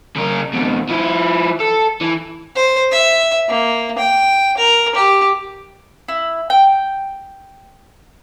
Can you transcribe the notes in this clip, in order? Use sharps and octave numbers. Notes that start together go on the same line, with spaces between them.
C#3 A#4
F2 B2
F3 E4
A4
E3
C5
E5
A#3
G5
A#4
G4
E4
G5